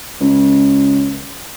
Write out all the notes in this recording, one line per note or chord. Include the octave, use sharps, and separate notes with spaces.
C#2